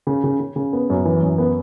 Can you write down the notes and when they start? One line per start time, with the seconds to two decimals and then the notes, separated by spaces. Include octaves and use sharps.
0.07 C#3
0.24 C#3
0.40 C#3
0.56 C#3
0.73 B3
0.90 F#2
1.05 E3
1.23 F#2
1.38 B3